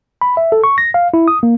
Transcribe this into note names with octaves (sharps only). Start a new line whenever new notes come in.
B5
E5
A4
C#6
A#6
F5
E4
D#6
A#3